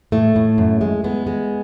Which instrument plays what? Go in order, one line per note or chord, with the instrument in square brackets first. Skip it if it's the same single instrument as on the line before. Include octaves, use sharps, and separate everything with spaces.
[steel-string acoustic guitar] A2 A3
A2
F#2
G#3
G#3 B3
G#3